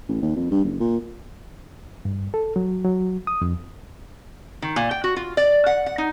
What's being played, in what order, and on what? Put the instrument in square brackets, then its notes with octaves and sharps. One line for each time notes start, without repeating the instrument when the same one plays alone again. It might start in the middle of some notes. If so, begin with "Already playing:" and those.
[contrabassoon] A1
D#2
F2
G2
F#1
A#2
[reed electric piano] G2
A4
F#3
F#3
D#6
F2
[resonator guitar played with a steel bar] D#3
A#2
G5
F#4
F4
D5
F#5
F#5
D#4